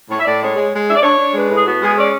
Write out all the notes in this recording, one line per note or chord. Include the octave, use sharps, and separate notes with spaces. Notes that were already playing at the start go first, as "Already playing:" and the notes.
A2 C#5
E5
A2 D5
G#3 C#5
G#3
G#3
D4 E5
D5
D4 C#5
D4
G#3 B4
A2 G#4
B3 F#4
G#3 G#4
C#4 D5